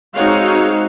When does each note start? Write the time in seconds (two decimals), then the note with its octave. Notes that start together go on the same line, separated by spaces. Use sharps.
0.14 G#3 C4 D#4 F#4 C#5 F5